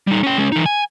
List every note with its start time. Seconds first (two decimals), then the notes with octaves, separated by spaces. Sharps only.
0.07 G3 D#4
0.23 C#4 G5
0.38 G#3 C#4
0.52 E3 D#4
0.66 G#5